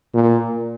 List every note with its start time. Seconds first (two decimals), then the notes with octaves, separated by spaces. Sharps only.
0.14 A#2